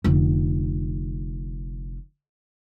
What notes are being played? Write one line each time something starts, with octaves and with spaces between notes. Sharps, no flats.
F1 D3